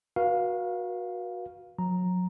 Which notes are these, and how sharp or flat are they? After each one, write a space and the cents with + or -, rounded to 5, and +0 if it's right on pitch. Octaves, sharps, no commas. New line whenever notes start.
F#4 -15 B4 -45 F5 +0
F#3 -30 A#5 +0